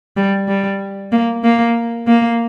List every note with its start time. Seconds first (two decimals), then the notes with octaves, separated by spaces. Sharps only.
0.17 G3
0.48 G3
1.12 A#3
1.43 A#3
2.07 A#3